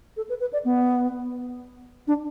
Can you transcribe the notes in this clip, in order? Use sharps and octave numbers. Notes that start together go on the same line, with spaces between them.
A4
B4
B4
D5
B3
D4